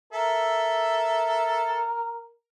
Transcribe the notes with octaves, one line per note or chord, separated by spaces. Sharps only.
A4 A#4 E5